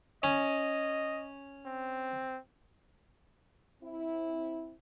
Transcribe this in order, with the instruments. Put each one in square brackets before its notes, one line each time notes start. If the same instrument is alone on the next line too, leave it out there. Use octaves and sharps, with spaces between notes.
[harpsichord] C#4 [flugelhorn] D#5
[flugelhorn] C4
[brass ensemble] C4 E4